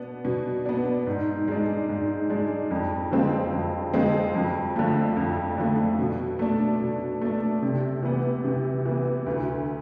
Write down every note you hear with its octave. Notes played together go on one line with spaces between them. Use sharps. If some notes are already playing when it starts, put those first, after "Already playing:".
Already playing: B2 B3 D4
B2
B3 D4
G#2
G#3 D4
G#2
G#3 D4
F2
D3 F3 G#3 C4
F2
D3 F3 G#3 C4
F2
D3 F3 A3
F2
D3 F3 A3
B2
A3 D4
B2
A3 D4
C3
E3 B3
C3
E3 B3
D2